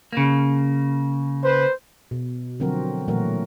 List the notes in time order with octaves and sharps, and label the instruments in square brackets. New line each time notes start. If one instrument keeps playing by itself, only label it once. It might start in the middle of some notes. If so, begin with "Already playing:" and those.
[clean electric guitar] C#3 A#3
[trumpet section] B4 C5
[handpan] B2
D3 F3 F#3 C4 F#4 A#4
A#2 E3 F#3 A3 F#4 A#4